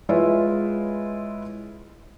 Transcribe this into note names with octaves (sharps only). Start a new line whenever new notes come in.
G#3 E4 F4 B4 C#5